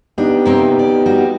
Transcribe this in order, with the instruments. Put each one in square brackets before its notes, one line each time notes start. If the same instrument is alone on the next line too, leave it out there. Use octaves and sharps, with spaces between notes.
[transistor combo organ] B3 D#4 G4 [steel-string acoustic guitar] D4
[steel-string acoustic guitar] C3 A#3 C4
D5
G3 F#4